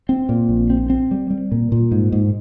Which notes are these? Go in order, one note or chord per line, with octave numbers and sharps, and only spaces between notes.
C4
A#2
A#1
C4
C4
G3
G3
A#2
A#2
G#2
G#2